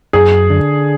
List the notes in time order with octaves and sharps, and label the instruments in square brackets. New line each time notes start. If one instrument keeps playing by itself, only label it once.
[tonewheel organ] F#2 [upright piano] G#4
[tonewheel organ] D3